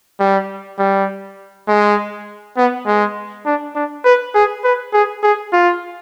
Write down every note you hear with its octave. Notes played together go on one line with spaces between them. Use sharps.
G3
G3
G#3
B3
G#3
D4
D4
B4
G#4
B4
G#4
G#4
F4